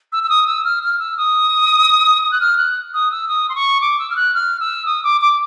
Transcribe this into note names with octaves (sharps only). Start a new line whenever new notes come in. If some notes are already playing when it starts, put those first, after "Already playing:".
E6
E6
D#6
E6
F6
F6
E6
D#6
D#6
F#6
F6
F#6
D#6
E6
D#6
C6
C#6
D6
E6
F6
F#6
F6
E6
D#6
D6
D6